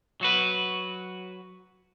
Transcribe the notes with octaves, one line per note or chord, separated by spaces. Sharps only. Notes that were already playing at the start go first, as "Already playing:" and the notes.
F#3 F#4 B4